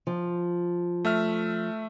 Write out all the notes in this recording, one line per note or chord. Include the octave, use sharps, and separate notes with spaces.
F3
A3 E5 F6